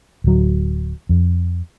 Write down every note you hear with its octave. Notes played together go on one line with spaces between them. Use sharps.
D1 F#3
F2